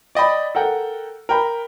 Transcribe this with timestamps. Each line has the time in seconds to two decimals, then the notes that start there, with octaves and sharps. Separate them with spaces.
0.15 D5 D#5 G5 B5
0.55 A4 A#4 F#5 G5
1.29 A#4 G5 B5